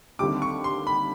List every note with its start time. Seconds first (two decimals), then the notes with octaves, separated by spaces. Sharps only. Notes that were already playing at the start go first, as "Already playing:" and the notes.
0.19 D#2 D3 G3 C4 D6
0.42 C#6
0.64 C6
0.87 B5